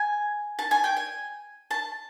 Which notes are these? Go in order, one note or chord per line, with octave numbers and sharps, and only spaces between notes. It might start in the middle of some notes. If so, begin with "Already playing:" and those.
Already playing: G#5
A5
G#5
G5
G#5
A5